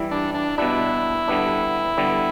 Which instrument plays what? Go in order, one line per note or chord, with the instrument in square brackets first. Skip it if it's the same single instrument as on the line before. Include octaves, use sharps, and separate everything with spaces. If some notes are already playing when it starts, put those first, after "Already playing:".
Already playing: [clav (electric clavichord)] E3 G3 E4
[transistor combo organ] D4
D4
[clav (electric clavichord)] B2 G3 D4 [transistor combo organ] E4
[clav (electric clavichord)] D3 G3 B3 D4
D3 G3 B3